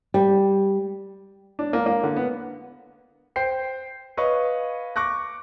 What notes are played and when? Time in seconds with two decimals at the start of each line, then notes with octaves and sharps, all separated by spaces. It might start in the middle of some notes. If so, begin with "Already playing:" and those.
0.14 G3
1.59 D4
1.73 A#3
1.86 A#3
2.03 D3
2.16 B3
3.36 C5 G5 C7
4.17 B4 C#5 D#5 F5 C#6
4.96 C#6 D6 F#6 A#6